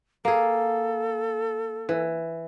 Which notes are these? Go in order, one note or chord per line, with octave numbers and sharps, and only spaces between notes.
A#3 G#4 A4
E3